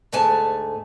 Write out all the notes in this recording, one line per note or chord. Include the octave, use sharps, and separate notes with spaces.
D2 G#2 A3 G#5 A5